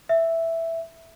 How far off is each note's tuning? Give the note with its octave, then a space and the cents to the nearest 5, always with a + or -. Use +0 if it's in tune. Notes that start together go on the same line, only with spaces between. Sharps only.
E5 +0